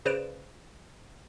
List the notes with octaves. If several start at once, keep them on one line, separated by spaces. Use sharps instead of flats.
C#3 B4 C5 D5 D7 E7